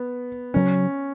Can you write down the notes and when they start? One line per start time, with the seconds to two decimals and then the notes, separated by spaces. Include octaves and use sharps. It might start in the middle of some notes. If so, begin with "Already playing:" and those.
Already playing: B3
0.54 C#3 F#3 C#4